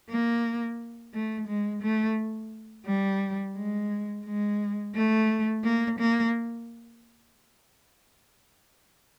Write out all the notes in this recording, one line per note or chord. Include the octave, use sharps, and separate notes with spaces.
A#3
A3
G#3
A3
G3
G#3
G#3
A3
A#3
A#3